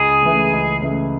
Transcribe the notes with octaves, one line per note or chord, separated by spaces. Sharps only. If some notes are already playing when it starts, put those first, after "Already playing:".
Already playing: C#2 G#4
C#3 E3 A3
C#2
C#3 E3 A3